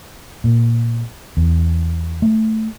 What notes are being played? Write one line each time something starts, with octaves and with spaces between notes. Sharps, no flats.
A#2
E2
A3